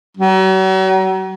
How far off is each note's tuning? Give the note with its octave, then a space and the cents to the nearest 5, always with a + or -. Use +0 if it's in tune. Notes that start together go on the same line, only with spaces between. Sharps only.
F#3 +40